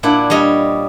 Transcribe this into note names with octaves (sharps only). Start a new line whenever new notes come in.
A#2 D4 E4 F#5
G3 C#5 D#5